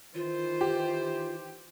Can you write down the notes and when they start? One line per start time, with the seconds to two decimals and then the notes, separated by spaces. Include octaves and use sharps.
0.15 D#3 E3 F4 C5
0.61 G4